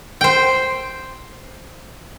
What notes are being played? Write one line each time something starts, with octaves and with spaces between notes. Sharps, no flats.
C5 G5